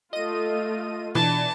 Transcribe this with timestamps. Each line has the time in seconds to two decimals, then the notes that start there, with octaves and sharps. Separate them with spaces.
0.13 A3 F4 D#5 D#7
1.15 B2 E3 D4 A5